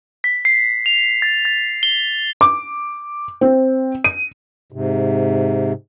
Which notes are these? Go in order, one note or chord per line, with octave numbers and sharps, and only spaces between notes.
B6
C7
F7
A6
A6
G7
D6
C4
D#7
G#2 C3